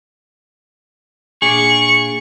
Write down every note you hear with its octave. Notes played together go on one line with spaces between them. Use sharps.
A#2 D4 G#4 C#6